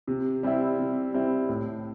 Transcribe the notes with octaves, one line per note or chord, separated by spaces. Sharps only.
C3
G3 C4 E4
C3
G3 C4 E4
A2